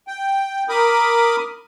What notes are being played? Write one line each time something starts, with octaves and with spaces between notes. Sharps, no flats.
G5
A#4 B5 D6 D#6